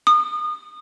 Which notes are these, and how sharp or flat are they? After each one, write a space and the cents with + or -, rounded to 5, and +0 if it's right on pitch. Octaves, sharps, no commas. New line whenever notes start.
D#6 -30